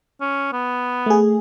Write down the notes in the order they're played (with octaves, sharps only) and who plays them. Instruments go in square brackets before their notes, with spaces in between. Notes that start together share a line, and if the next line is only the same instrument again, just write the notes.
[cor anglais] C#4
B3
[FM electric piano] A3 G#4